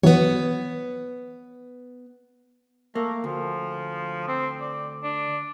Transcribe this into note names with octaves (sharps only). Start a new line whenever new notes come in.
E3 F#3 B3 C#5
A3 A#3
D2 F3
C4
D5
D4